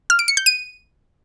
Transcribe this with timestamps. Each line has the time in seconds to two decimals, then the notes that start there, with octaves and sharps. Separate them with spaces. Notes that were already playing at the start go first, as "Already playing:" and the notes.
0.10 F6
0.19 D7
0.28 C#7
0.37 G6
0.46 D#7